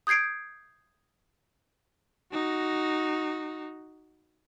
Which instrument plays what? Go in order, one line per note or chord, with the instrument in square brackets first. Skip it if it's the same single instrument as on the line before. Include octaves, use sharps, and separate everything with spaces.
[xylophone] D#6 G6 G#6 C7 D7
[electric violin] D#4 F#4